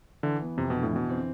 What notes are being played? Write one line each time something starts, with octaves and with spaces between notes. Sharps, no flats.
D3 E3
B3
F2 C3
B2 D3
A2
B2 E3
C4